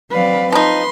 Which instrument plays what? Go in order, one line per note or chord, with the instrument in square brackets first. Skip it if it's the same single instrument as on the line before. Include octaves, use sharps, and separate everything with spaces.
[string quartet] F#3 C4 D5 [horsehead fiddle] B4 F5
[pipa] F3 D#4 [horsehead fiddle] B4 [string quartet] C6